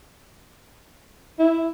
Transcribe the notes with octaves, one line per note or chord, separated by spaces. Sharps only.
E4